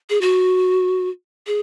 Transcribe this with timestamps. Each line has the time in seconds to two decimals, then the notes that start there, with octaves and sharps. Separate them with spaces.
0.10 G#4
0.21 F#4
1.47 G#4